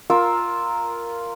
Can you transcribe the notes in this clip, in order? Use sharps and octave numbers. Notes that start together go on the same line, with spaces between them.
F4 A#4 E6